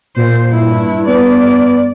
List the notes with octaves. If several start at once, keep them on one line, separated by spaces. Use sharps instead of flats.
A#2 C5
G2 E4
B3 D5